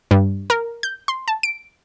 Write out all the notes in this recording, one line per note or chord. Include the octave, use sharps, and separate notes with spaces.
G2
A#4
G6
C6
A5
D7